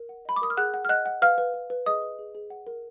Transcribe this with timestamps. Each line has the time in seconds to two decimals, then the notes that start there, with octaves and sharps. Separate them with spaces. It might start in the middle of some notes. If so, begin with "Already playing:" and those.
Already playing: A#4
0.09 F#5
0.25 D#5 B5
0.36 D6
0.42 A#4 D#6
0.50 F6
0.57 G#4 F#5 F#6
0.74 F#5
0.85 F6
0.89 D#5 F#5 F#6
1.06 F#5
1.22 B4 F5 F6
1.38 B4
1.54 B4
1.70 B4
1.86 G#4 D#5 D#6
2.02 B4
2.19 G#4
2.35 G#4
2.50 F#5
2.67 A#4